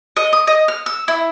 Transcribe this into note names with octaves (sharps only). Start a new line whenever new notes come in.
D#5
D#6
D#5
F6
E6
E4